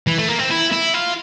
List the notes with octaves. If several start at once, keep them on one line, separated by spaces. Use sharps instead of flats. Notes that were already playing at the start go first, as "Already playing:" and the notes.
E3
A3
A#3
C4
E4
E4
F4